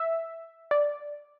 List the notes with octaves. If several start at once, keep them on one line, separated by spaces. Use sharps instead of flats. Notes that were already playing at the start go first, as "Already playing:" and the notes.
Already playing: E5
D5